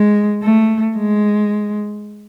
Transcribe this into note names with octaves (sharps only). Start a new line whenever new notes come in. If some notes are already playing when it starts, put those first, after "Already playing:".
Already playing: G#3
A3
G#3